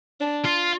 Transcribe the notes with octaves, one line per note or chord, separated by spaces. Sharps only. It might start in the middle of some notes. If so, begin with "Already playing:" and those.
D4
F4